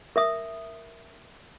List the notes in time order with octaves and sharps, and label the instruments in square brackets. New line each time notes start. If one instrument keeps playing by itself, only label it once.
[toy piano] A#4 E5 D#6